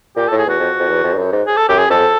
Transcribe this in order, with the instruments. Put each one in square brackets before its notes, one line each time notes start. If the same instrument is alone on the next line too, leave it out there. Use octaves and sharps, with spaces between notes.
[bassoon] A#2 [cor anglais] G4
[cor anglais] A4
[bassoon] A2
[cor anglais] G#4
[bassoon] E2 [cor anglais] F#4
[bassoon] F2
F2
E2
F2
G2
F#2
G#2
[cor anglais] G#4
A4
[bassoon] F#2 [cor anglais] G4
[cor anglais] G#4
[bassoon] F2 [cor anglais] A4